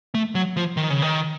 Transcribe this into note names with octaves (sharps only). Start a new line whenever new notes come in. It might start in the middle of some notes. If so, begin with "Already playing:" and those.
A3
F#3
F3
D#3
C#3
D#3